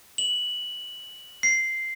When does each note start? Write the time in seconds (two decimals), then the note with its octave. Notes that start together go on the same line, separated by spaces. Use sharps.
0.18 F#7
1.43 C7